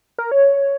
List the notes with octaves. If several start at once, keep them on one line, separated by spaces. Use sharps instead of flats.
A#4
C#5